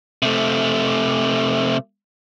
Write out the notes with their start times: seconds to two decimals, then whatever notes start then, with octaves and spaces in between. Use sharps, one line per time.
0.22 C3 A3